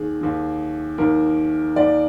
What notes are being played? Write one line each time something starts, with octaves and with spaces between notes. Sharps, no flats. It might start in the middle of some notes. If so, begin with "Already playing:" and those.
Already playing: D#2 D#3 G#4
D#2 D#3
D#2 D#3 A#4
D#2 D#3 D5